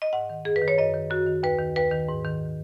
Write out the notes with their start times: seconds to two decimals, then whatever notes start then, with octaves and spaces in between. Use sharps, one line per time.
0.02 D#5
0.13 G#2 F#5
0.30 D#3
0.45 F#2 G#4
0.56 B4
0.62 D#3
0.68 C#5
0.78 F#2 D#5
0.94 D#3
1.10 F#2 F#4
1.27 D#3
1.43 D#2 B4
1.59 D#3
1.76 D#2 B4
1.92 D#3
2.08 G#2
2.25 D#3